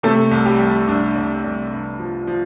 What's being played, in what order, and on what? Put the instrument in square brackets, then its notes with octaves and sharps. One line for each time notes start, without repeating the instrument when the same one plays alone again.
[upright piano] C3 A3 A4
C2
G3 G4
C2
C2 D4
C2
C2
G2
F3
F3